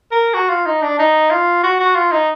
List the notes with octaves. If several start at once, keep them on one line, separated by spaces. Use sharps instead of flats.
A#4
F#4
F4
D#4
D4
D#4
F4
F#4
F#4
F4
D#4